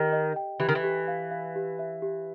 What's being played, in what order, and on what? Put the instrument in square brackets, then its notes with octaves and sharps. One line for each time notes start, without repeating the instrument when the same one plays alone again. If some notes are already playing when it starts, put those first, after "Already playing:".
Already playing: [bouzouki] D#3 [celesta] G4 D#5
[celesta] D#5
G5
[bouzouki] E3 [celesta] G4
[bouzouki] D#3
E3
[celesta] G4
F5
F5
G4
E5
G4